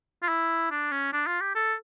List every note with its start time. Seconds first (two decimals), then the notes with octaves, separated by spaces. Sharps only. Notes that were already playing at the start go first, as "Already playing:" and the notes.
0.23 F4
0.29 E4
0.71 D4
0.92 C#4
1.13 D4
1.27 F4
1.41 G4
1.55 A4